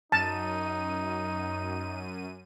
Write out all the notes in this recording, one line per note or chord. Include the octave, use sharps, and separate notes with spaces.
F#2 D#4 A5 D#7